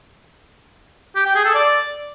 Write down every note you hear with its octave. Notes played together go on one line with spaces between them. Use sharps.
G4
G5
G#4
A4
D5